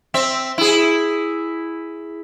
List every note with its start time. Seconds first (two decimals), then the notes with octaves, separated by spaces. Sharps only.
0.14 C4 E5
0.58 E4 G#4